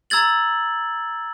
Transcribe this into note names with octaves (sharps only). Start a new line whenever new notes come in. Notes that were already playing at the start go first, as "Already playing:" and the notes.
A#5 E6 G#6 A6 F#7